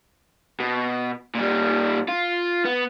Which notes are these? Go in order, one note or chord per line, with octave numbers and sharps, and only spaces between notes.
B2
A#2 G3
F4
B3